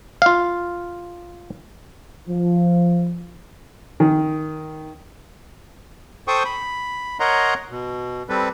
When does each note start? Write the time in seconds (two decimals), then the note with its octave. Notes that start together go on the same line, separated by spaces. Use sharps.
0.22 F4 F5
2.29 F3
4.00 D#3
6.28 A4 C5 G5 C#6 D#6
6.45 B5
7.20 A#4 C#5 D#5 F#5 A#5 C6
7.71 B2
8.29 G3 C4 A4 B4